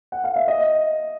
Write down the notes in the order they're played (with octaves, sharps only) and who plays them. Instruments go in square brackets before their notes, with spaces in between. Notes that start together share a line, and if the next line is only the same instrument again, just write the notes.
[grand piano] F#5
F5
E5
D#5